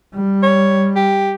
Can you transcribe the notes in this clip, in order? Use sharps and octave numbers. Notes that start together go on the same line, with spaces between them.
G3
C#5
G4